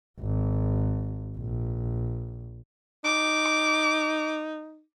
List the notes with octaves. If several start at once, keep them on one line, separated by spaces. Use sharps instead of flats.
G#1
A#1
D#4 D6